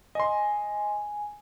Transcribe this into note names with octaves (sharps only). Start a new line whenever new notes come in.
D#5 G#5 C6